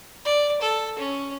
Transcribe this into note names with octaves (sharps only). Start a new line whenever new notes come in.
D5
A4
C#4